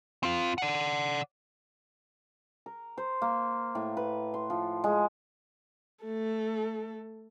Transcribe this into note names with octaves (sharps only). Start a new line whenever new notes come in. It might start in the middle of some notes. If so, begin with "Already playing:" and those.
C4 F4
D5 F#5
A#4
C5
A#3
A2
B4
C6
F3
G#3
A3 A4